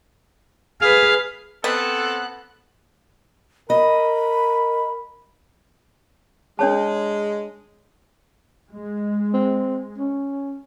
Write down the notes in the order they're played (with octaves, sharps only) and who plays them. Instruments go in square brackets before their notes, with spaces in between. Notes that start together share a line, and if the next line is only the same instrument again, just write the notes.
[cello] G#4 B4 [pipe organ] F5
[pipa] B3 [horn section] C4 A4 [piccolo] F#6
[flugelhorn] A#4 [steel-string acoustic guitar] D#5 [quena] B5
[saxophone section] G#3 [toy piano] D4 C#5 A5
[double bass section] G#3
[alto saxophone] C4
C#4